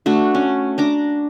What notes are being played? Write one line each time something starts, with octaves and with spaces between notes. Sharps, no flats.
A3 D4 F#4
C#4
D4 A#5 D6